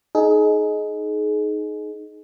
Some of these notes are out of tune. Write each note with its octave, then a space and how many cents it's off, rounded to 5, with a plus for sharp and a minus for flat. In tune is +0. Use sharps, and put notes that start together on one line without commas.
D#4 +0 G#4 +30